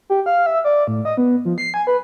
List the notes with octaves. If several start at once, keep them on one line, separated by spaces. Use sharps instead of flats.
G4
F5
E5
D5
A2
D#5
B3
F3
C7
G#5
B4